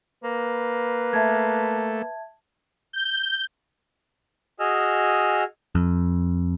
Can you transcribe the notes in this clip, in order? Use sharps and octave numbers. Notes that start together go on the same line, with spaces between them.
A#3 B4
A3 E5 A5 G#6
G6
F#4 G#4 D#5 G#5 E6 F6
F2